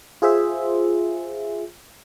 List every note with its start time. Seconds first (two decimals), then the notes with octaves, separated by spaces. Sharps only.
0.22 F4 G#4 C5 E5